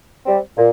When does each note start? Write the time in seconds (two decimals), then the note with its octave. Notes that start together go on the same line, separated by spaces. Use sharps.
0.25 G3 C4
0.57 A#2